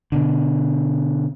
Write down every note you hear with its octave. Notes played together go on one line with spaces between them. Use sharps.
B2 D3